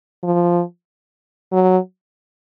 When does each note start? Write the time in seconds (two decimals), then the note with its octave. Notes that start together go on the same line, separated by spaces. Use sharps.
0.24 F3
1.52 F#3